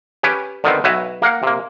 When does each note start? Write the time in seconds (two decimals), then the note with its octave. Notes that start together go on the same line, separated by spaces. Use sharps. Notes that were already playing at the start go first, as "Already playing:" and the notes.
0.23 C#4 G4 B4 C#5
0.64 D3 D#3 B3 C4
0.84 B1 F#4 B4 C#5 E5
1.22 A#3 A#4 F5 F#5
1.43 C3 A#3